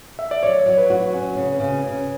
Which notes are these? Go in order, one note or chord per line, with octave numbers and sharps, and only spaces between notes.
E5
D5
F#3 C#5
F#3
B4
F#4
C#4
C#3
C#3
C#3